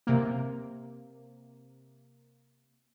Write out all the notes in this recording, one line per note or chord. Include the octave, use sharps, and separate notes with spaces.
C3 A#3